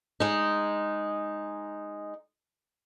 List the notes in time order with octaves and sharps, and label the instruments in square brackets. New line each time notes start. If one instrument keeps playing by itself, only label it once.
[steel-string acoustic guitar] G#3 D#4